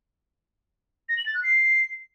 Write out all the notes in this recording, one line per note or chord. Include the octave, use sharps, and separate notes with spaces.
A#6
F#7
A6
F#6
C7